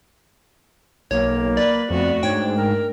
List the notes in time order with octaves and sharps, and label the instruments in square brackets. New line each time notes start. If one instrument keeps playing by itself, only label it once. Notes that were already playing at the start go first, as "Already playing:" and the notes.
[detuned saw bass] B1 [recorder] A#3 [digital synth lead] C#5
[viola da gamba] B4 [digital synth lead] D5
[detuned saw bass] F2 [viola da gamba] A3 B3 F#4
[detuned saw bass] G#2 [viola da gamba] D4 [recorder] C#5 [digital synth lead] G5
[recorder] A#4